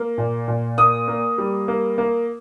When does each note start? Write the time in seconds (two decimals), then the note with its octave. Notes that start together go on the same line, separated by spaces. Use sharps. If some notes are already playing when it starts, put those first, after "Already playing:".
Already playing: A#3
0.18 A#2
0.48 A#2
0.78 A#3 D#6
1.08 A#3
1.38 G3
1.68 A#3
1.98 A#3